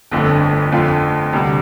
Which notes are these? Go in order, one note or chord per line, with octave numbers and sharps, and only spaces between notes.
G1 F2 D3 A3
F2 D3 A3 F4
D2 C3 G3